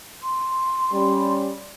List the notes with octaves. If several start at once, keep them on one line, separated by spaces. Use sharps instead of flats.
C6
G3 C#4